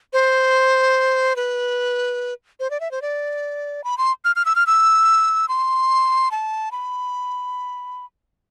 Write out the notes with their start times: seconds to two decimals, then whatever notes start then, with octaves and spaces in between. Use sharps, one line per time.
0.13 C5
1.36 B4
2.60 C5
2.70 D5
2.80 E5
2.91 C5
3.02 D5
3.84 B5
3.98 C6
4.25 F6
4.36 F6
4.45 E6
4.56 F6
4.67 E6
5.49 C6
6.31 A5
6.72 B5